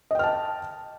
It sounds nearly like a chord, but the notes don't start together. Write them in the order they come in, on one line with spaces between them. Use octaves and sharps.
D#5 G5 F6 A5